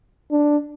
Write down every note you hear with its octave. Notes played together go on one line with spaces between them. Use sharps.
D4